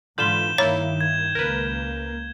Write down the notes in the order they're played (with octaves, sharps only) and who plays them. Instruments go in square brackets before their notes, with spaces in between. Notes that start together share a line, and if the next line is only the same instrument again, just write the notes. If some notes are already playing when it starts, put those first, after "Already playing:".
[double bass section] G#2 E3 [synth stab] D3 F4 B5 [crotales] G6 E7 G7
[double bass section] G2 D#3 [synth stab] A#3 E4 [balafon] C#5
[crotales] G#6
[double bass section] C#2 A#3 [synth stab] A#4 B4